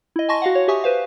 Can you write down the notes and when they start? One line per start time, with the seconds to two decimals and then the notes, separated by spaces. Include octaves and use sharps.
0.16 E4 D#5
0.29 G#5 A5 C6 C#6 A#6
0.42 F#4 F5 F#5
0.55 C#5
0.68 G4 E5 G#5 C#6 D#6
0.84 B4 C5 F5